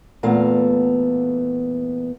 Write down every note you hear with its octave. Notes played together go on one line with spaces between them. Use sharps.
E2 A#2 A3 B3 F5